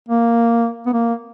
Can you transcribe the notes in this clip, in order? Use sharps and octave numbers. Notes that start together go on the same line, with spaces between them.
A#3
B3
A#3